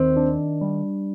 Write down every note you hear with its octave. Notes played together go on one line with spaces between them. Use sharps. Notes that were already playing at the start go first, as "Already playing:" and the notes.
Already playing: D#2 D#3 C4
D4
G3